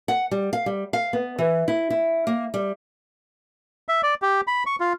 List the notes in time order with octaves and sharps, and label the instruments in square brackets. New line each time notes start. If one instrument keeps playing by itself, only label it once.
[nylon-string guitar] F#5
G3
F5
G3
F5
B3
E3
E4
E4
A#3
G3
[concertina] E5
D5
G4
B5
C#6
F4